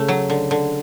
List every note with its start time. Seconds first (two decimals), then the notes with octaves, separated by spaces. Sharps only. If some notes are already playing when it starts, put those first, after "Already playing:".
Already playing: C#3 A3
0.08 F#3
0.30 D3
0.51 D3